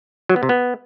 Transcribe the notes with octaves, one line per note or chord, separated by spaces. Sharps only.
F#3
B3
C3
B3